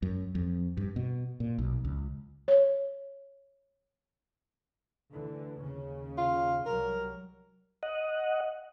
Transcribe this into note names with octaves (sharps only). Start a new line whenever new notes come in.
F#2
F2
G2
B2
A#2
B1
C#2
C#5
D2 D3 E3
D#2 C#3 C#4
F4
C2 F#3 G3 A#4
D#5 F#5